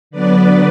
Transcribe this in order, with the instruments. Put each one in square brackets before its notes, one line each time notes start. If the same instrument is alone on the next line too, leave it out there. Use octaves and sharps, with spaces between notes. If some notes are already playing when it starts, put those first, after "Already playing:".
[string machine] D3 F#3 B3 B4 D5